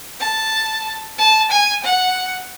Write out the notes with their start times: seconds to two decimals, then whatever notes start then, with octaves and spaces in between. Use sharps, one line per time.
0.21 A5
1.18 A5
1.51 G#5
1.84 F#5